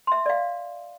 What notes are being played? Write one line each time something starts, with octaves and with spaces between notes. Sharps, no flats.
E5 C6
D5 F5